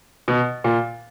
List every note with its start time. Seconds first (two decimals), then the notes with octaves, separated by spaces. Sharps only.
0.28 B2
0.64 A#2